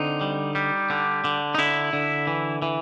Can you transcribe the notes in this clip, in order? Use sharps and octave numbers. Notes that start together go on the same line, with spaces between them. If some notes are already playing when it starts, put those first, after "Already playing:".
Already playing: D3 C4 D#4
G3
G3
D3
D3
D#4
D3 E4
D3
E3
E3